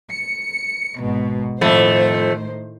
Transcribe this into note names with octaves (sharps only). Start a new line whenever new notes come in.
C#7
G#1 G#2 B2
F2 A2 D#3 A3 C5